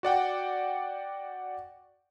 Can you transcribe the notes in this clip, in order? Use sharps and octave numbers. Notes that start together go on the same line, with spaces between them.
F#4 D5 F#5 G5